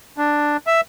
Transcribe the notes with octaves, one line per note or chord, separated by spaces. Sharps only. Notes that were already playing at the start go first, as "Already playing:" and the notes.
D4
E5